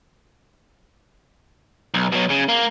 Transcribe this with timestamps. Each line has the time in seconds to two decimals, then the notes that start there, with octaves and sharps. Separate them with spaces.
1.94 B1
2.12 B2 F#3
2.30 C#3
2.49 A#3